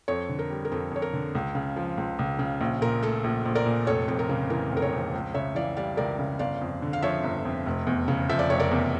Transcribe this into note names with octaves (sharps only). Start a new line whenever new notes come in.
F2 A4 C#5
D3
A#4
G3
A#4
F2 A4
F2 C#5
A#4
D3
C#2
C#3
F3
C#2
C#2
C#3
A#1
A#2 A#4
A3 A4
A#1
A#1
A#4 D5
A#2
F1 A4 C#5
F2 A4
A#4
C#3
E3 A#4
F1
A#4
A4 C#5
F2
C#2
C#3 C#5 E5
E3 D5 F5
G3 D5 F5
C#2 A#4 D5
C#3
G1 D5 F5
F2
D3
F5
F3 C#5 E5
G1
F2
F1
E2
C#3
F3 E5
D5
F1 C#5
A#4 D5
E2